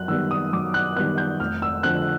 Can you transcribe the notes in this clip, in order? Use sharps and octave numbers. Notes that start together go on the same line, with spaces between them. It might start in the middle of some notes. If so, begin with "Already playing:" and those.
Already playing: F#2 F#6
D#3 G3 B3 E6
D#6
F#2 D6
F#6
D#3 G3 B3 F#6
G6
F1 F6
E6
F2 D3 F#6